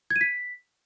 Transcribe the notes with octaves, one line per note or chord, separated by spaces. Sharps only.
G#6
D#7
B6